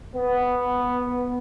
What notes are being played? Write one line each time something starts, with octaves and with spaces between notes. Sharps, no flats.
B3